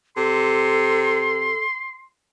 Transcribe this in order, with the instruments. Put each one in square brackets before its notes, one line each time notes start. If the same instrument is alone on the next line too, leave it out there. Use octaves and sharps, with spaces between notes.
[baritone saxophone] C3 [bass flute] A4 [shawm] C6